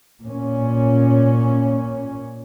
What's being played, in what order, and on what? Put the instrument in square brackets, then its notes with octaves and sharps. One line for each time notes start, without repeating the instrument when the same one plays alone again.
[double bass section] A#2 C#4